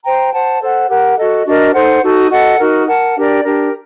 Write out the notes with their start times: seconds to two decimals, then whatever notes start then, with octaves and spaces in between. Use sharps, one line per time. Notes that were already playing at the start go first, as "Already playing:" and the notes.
0.04 C5 G5 A#5
0.32 C5 F#5 A5
0.61 A4 C5 F#5
0.88 G4 A#4 F#5
1.17 F#4 A4 D#5
1.46 D4 F#4 A#4 D#5
1.74 D#4 A4 C5 F#5
2.03 D#4 F#4 A4
2.31 F#4 A4 D#5 F#5
2.59 D#4 F#4 A#4
2.88 A#4 F#5 A5
3.16 D4 G4 A#4 D5
3.44 D4 G4 A#4